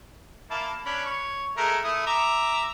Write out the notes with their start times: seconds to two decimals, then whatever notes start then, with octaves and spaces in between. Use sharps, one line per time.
0.51 A#3 E4 A5
0.85 C#4 D4 B5
1.06 C#5
1.57 G#3 A3 A#4
1.84 A3 E4 D#6
2.07 E5 A#5 D6